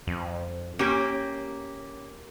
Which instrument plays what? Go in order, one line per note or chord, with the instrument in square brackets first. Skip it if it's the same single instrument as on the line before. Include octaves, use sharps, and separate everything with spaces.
[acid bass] F2
[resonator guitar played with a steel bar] A#3 G4 [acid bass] C#4